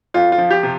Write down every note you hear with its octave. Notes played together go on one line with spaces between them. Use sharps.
F2 F4
F4
F3
G4
C3